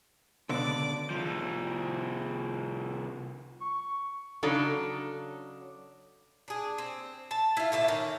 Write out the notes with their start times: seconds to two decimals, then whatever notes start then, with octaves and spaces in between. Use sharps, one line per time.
0.49 C#2 B2 D3 D5 D6
1.10 C2 F3
3.61 C#6
4.43 C#3 F#3 D4 D#4 A4
6.48 D4 G#4
6.78 C4
7.31 A5
7.57 E4 F4
7.72 A2 D3 E4 A5
7.88 D#3 C#4